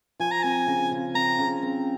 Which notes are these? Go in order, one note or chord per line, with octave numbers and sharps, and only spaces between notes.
F3 G#5
A#5
C4 G#5
C#3
C#3
C4 A#5
C#3
C4